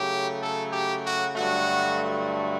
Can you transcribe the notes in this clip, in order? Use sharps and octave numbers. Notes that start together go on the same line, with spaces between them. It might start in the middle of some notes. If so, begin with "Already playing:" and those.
Already playing: C#3 F#3 A3 G4
A4
G4
F#4
G2 D3 F#3 A3 F#4